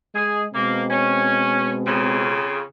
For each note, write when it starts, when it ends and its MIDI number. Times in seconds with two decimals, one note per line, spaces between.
0.15 0.46 56
0.15 0.42 68
0.54 2.43 47
0.54 2.43 56
0.54 0.82 58
0.54 2.43 60
0.91 1.71 61
1.86 2.62 41
1.86 2.62 49